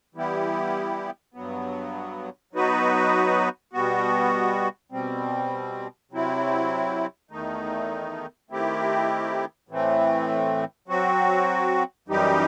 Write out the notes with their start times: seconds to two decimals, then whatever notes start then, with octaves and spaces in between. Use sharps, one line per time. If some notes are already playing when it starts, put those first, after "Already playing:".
0.15 E3 G3 B3 E4 G4
1.34 G2 F#3 B3
2.53 F#3 B3 D#4 F#4 B4
3.73 B2 G3 B3 F#4
4.92 B2 G3 C4
6.11 C3 F#3 C4 E4
7.31 E2 D#3 A3 D#4
8.50 D#3 A3 C4 E4 G4
9.69 A2 E3 A3 C4
10.88 F#3 C4 F#4
12.08 F#2 E3 G3 D#4 G4